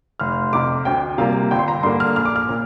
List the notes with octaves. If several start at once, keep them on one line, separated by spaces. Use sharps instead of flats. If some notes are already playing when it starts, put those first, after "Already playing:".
F1 F6
F2 C3 D6
D2 G5
C3 G3 A#3 F4 F5
G1 G5
C6
A#5
G2 D3 A#3 D4 C6
F6
A#1 F6
D6
F6
A#2